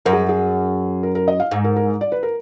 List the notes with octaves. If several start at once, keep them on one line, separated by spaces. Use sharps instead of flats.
F#2 A#4
G#4
G#4
A#4
A#4
D#5
F5
G#2
A#4
A#4
D5
B4
A#4